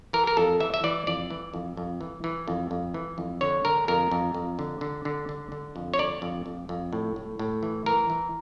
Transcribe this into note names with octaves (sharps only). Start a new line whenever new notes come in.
E3 A#4
A#4
F2 A4
E3 E5
E5
E3 D5
F2 D5
E3
F2
F2
E3
E3
F2
F2
E3
F2
D3 C#5
D3 A#4
F2 A#4
F2
F2
D3
D3
D3
D3
D3
F2
C#5
D3 D5
F2
F2
F2
A2
A2
A2
E3
E3 A#4
E3